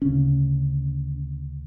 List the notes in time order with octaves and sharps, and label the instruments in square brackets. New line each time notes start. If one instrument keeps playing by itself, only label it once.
[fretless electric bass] D2 C#3 C#4